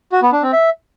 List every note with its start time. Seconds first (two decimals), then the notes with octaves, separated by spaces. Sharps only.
0.12 F#4
0.22 B3
0.32 D4
0.43 C4
0.53 E5